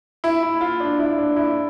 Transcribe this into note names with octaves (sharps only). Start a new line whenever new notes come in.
E4
E4
F4
D4
E4
D4
E4